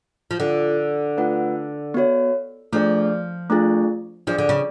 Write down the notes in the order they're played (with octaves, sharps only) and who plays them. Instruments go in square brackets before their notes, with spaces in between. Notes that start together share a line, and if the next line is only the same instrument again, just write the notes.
[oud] F3
[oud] D3 [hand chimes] D4 F4 A4
[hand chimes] A3 D4 F4 B4 F#5
B3 F#4 C#5
[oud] F3 [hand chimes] A3 D4 G#4 D5
[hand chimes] A3 D4 F4 G#4
[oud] F3 [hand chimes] D4 G#4 D5
[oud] D3
C#3